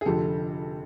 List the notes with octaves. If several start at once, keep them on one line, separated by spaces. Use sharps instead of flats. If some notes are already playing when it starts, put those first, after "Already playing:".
G#4
F1 F2 D3 F3 G4 A4